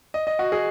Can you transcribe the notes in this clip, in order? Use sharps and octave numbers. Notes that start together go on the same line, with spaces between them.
D#5
D#5
F#4
G#4